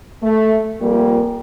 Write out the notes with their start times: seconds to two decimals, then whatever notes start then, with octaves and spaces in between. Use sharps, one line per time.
0.22 A3
0.81 F2 A#2 G3 A#3